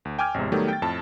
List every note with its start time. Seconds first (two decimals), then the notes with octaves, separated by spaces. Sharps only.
0.05 D2
0.19 G5 G#5 D6 F6 G#6
0.34 A1 E2 C3 G#3
0.52 D#3 F#3 G3 A3 B3 G4
0.68 G5 A6
0.82 F2 A2 A5